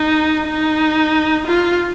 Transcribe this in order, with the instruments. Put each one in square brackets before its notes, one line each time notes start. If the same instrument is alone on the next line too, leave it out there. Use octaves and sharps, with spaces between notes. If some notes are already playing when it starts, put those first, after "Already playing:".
Already playing: [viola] D#4
D#4
F4